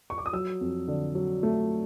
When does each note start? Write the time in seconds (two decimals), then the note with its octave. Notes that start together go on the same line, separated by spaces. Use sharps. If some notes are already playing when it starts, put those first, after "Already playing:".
0.10 C#6
0.18 D6
0.26 D#6
0.33 F#3 E6
0.61 F2
0.88 D3
1.15 F#3
1.43 A3